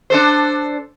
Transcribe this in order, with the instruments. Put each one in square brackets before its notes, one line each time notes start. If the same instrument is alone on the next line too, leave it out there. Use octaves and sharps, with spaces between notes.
[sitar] D4 A4 C5